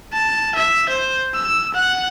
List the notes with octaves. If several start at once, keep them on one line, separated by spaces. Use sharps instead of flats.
A5
E5
C5
E6
F#5